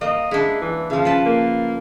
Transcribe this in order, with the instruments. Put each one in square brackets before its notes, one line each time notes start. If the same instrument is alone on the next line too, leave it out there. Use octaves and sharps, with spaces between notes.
[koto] A#3 [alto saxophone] D#5
[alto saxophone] G#3 [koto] D4 E4
[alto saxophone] E3
[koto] C#3 F3 [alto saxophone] F5
[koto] B4 A5
[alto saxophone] A#3